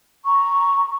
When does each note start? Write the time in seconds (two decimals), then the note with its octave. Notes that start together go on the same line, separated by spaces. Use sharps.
0.24 A#5 C#6